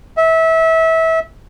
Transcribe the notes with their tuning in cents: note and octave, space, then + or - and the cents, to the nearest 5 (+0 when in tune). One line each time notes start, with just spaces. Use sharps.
E5 -25